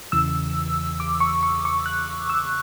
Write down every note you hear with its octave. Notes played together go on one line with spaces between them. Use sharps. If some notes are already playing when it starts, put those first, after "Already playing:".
E2 C#3 E3 E6
D6
C#6
C#6
C#6
F#6
E6